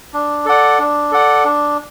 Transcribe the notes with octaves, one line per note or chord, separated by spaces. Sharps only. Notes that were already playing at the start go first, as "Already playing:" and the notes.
D4
A4 D5 F#5
D4
A4 D5 F#5
D4